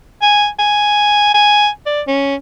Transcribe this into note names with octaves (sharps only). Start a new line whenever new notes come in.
G#5
G#5
G#5
D5
C#4